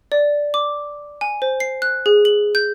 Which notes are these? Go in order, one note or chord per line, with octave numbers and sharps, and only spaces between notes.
D5
D6
G#5
C5
C7
F#6
G#4
F#7
G6